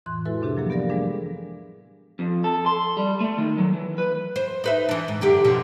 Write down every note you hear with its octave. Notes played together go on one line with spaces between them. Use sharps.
F2 A2 E3 C6 F#6
G#3 E4 F#4 A4 B4 E5
C3 D4 G4 G#4
F3 F#3 A#3 G#4
B3 G4 A4 A#4 D5 F5
E3 G3 G#3 B3 D4 G#4
F2
A4
C6
G3
A3
D#3
F#3
E3
B4
C5
D#4 B4 E5
E3 D4
G#2
F#2 D3 G4
B2 D3 F3